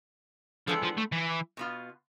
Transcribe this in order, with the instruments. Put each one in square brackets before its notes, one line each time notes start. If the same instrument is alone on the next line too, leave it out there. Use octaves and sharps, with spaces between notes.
[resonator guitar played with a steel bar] E3 G#3 B3 D4 A4 [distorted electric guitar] F3
[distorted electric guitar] F3
A3
E3
[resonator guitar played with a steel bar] B2 B3 F4